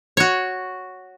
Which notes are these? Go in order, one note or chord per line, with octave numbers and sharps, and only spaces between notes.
F#4 C#5